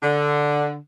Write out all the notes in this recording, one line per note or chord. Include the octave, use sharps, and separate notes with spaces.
D3